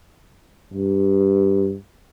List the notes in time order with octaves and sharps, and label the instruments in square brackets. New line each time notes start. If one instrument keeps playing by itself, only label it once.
[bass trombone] G2